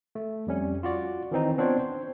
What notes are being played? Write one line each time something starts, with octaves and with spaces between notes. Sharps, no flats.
A3
F2 G3 C#4
F4 F#4 D5
D#3 E3 C4 D#4
B3 C4 D4 F4 C5 C#5
C5